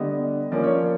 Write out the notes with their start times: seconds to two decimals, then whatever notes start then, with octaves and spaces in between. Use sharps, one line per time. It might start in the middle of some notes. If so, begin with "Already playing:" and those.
Already playing: D3 G3 B3 D#5
0.51 F3 A#3 C#4 D5
0.64 C#5
0.73 D5